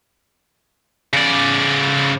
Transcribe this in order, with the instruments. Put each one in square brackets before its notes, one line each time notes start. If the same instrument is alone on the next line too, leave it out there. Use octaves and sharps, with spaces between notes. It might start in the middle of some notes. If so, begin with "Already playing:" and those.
[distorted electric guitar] C#3 D5